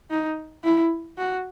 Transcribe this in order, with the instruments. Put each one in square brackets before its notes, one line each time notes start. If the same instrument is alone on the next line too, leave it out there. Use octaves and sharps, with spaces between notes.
[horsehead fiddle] D#4
E4
F#4